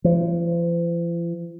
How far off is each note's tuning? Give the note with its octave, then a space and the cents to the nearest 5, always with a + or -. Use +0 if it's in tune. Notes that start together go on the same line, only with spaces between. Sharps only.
F3 -45